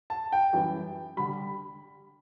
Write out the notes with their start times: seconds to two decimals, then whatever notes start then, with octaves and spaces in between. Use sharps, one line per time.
0.10 A5
0.32 G5
0.53 F#2 E3 G3
1.17 D3 G3 B5